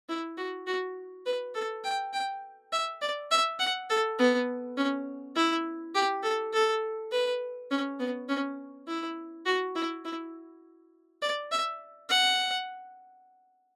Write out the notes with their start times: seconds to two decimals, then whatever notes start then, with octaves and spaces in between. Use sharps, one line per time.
0.09 E4
0.38 F#4
0.67 F#4
1.26 B4
1.55 A4
1.84 G5
2.13 G5
2.72 E5
3.01 D5
3.31 E5
3.60 F#5
3.89 A4
4.19 B3
4.77 C#4
5.36 E4
5.95 G4
6.23 A4
6.53 A4
7.12 B4
7.71 C#4
8.00 B3
8.29 C#4
8.87 E4
9.46 F#4
9.75 E4
10.05 E4
11.22 D5
11.51 E5
12.09 F#5